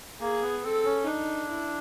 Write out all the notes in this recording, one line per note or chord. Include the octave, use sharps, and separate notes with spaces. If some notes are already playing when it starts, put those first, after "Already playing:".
A#3 G#4
B3
C4 A4
C#4
D4 D#4
E4